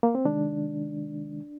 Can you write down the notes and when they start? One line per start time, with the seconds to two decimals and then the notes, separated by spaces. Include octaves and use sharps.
0.03 A#3
0.15 C4
0.25 C3 D#3 G#3 D4